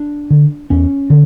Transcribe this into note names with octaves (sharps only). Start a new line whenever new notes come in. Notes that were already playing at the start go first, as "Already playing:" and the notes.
Already playing: D4
D3
E2 C#4
D3